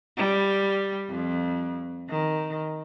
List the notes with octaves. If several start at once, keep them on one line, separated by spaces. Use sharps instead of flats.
G3
F2
D#3